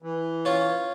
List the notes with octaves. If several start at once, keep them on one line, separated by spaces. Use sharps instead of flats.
E3
C#4 F4